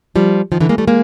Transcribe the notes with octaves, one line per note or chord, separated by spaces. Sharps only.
F3 G3
D#3 F3
D3 E3
G#3 A#3
G3 A3
G#3 A#3